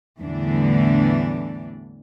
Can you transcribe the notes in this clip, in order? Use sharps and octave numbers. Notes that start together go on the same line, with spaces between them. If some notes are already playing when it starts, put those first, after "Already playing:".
E2 A2 D3 E3 G3 D4